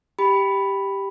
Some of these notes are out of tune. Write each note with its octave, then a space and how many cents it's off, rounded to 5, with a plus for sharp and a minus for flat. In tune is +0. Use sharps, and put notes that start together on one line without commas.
G4 +0 B5 +0